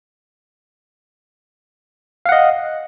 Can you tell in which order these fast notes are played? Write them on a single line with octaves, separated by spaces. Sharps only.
F5 F#5 D#5